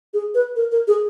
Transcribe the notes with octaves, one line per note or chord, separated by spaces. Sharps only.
G#4
B4
A#4
A#4
G#4